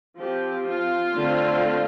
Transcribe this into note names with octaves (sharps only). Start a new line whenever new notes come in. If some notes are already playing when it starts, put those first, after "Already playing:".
F3 C4 G4
F4
D3 A3 C4